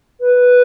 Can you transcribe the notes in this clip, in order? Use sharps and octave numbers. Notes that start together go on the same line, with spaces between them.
B4